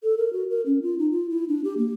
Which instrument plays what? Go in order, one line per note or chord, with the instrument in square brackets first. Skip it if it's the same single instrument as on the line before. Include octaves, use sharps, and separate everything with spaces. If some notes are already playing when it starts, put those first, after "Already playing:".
[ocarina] A4
A#4
F#4
A#4
C#4
F4
D#4
F4
E4
D4
G4
A#3